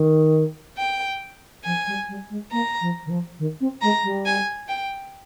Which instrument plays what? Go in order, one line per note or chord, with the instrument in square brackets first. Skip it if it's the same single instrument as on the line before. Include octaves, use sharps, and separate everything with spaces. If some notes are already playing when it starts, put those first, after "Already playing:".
Already playing: [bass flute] D#3
[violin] G5
[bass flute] F3 [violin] G#5
[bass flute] G3
G3
G#3
[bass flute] A#3 [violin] A#5
[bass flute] F3
D#3
F3
D#3
C4
[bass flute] G#3 [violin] A#5
[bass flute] G3
[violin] G#5
G5